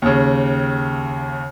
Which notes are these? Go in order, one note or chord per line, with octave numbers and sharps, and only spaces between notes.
D#2 C#3